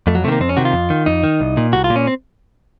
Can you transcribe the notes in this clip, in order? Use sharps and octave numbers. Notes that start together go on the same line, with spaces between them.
F2 A3
F#3
C3 D#3 A3 A#3
F2 C4
C#4
C3 D#3 F#4
F4
F2
D#3
F2 D#4
D#3
C2
A#2
C2 F#4
F4
A#2
C#4
C4